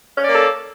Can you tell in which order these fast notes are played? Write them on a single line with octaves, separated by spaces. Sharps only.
C#4 D5 A#3 A4